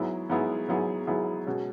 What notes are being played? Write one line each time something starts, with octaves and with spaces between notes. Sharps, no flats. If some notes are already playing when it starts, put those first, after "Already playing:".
Already playing: G#2 F#3 B3 E4 G#4
G#2 F#3 B3 E4 G#4
G#2 F#3 B3 E4 G#4
G#2 F#3 B3 E4 G#4
B2 G#3 C#4